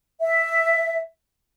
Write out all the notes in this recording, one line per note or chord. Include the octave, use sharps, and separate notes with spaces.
E5